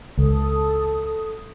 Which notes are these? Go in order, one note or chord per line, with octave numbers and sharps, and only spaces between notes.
C#2 A4 D#6